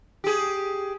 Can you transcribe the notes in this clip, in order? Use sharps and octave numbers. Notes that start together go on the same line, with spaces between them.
G4 G#4